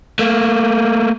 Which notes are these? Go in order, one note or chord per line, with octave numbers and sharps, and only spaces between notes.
A3 A#3